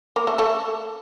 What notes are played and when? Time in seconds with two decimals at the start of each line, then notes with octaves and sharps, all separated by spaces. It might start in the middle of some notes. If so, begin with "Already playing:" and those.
0.16 A#3 A#4
0.27 A3 A4
0.38 A3 A4